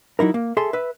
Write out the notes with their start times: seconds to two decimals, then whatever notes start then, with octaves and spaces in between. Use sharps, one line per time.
0.19 F#3 D#4 E4 A#4
0.34 A#3
0.57 G#4 A4 E5 C6
0.73 B4 E5